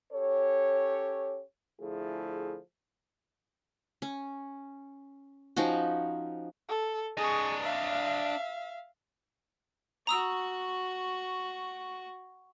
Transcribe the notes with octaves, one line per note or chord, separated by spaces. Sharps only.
C#4 G4 A4 C#5
D3 F3 A3 E4 G#4
C#4
F3 C#4 D#4 F#4
A4
D4 G#4 D#5 C#6
E5 F5
F#4 A#5 C#6 D#6 E6